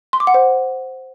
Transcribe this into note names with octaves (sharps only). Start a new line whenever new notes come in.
C6
D6
F#5
C5